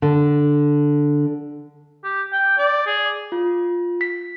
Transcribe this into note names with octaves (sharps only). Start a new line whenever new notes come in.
D3
G4
G5
D5
G#4
F4
B6